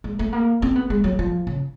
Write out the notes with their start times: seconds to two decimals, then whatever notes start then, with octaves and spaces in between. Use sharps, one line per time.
0.04 G#3
0.19 A3
0.33 A#3
0.62 C4
0.76 B3
0.90 G#3
1.04 F#3
1.19 F3
1.47 C#3